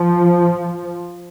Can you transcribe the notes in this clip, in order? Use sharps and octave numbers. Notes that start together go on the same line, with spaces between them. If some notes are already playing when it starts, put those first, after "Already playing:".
Already playing: F3